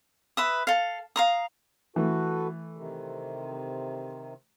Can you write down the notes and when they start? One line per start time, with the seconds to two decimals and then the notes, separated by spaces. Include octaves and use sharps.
0.37 B4 E5 D#6
0.67 A4 F5
1.16 F5 A#5 D#6
1.96 E3 A3 F#4 A4 B4
2.77 C3 D#3